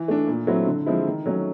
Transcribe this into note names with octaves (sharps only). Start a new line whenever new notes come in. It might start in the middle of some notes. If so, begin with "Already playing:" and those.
Already playing: E3
A3 D4
A#2
F#3 A3 C4 E4
D3
F3 G#3 C4 E4
D#3
F#3 A3 C#4